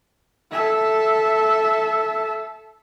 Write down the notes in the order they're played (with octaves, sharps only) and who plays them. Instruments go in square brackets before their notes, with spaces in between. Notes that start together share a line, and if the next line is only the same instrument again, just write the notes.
[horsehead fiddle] A4 E5